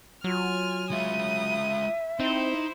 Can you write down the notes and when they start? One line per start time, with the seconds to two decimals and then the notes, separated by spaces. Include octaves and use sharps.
0.24 F#3 F4 G#5 F6
0.91 G#3 F4 E5 D#6
2.20 C4 D#4 E4 C5